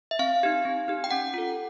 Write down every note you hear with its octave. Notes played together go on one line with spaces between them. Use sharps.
E5
C4 F5
D#4 G4
C4
D#4 G4
G5
C#4 F#5
F4 A4